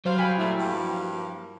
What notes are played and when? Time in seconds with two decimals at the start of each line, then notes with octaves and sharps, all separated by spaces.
0.06 F#3 G3 C5 F5
0.18 G5 G#5 B5
0.38 A#2 G3 A3 E4
0.60 G2 F3 A#3 G5